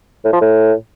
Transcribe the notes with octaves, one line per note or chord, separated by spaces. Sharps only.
A2
F3
A2